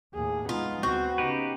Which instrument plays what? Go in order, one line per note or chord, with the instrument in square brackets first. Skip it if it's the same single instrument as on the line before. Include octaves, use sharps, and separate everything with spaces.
[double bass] D#2 A2 [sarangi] G#4
[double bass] G#3 D#4 [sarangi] B3 [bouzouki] F4
[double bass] D2 [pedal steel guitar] C4 [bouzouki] F#4
[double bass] C#3 [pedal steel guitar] D#4 G4 B4